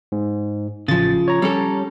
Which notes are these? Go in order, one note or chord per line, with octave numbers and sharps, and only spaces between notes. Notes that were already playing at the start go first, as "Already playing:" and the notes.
G#2
A1 C#3 F3 A6
C#5 A#5
G3 C#4 A4